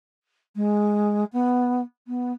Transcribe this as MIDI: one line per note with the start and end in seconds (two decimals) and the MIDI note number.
0.55 1.24 56
1.32 1.81 59
2.07 2.32 59